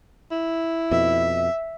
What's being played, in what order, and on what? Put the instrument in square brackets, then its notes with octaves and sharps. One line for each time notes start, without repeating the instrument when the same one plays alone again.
[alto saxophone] E4
[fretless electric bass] F2 B2 [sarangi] E5